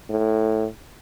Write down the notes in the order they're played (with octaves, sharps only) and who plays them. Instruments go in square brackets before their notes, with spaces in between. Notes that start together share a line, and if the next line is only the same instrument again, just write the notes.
[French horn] A2